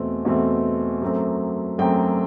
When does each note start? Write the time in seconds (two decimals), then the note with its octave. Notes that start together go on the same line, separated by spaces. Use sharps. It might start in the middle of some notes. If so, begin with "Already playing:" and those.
Already playing: E2 B2 A3 C4
0.25 E2 B2 A3 C4
1.02 F#2 F#3 A3 C4
1.78 F#2 F#3 A3 C4 G5